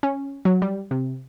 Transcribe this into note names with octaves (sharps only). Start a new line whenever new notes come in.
C#4
F#3
G3
C3